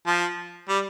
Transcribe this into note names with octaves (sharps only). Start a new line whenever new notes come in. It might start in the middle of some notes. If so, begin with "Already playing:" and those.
F3
G3